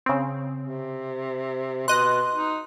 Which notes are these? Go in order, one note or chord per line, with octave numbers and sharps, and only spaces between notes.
C#3 C4
C3
B2 D#5 C6 F#6
D#4